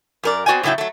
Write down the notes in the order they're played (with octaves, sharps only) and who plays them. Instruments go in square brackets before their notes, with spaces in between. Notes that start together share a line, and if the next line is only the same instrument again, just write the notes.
[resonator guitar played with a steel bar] F#2 A#4 D5
B3 C4 F#4 D5 G5 G#5
A2 C#3 F#3 E4 G5
F#3 A3